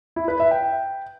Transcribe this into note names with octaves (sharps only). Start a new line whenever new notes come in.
E4
B4
E5
G5